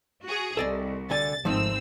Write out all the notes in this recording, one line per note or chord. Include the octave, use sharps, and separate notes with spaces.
F#4 G#4
C2 A4 D5 D#5
D2 D3 G#5 A6
G#1 F3 A3 C4 D#4 E6